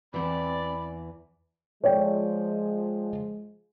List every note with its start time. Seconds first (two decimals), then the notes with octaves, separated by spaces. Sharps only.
0.14 E2 G#2 E3 C4 D5 B5
1.84 F3 G#3 C#5 D5 G5